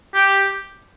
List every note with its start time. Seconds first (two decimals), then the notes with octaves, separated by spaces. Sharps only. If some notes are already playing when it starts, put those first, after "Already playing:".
0.15 G4